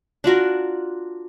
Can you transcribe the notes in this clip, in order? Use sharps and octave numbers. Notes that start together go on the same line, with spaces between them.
D4 F4 F#4 A#4